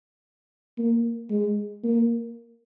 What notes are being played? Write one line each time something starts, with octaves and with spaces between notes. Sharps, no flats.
A#3
G#3
A#3